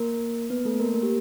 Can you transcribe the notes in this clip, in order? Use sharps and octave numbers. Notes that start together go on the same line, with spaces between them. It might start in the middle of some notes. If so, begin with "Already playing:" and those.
Already playing: A#3 A#4
B3 B4
A3 A4
A#3 A#4
A#3 A#4
G4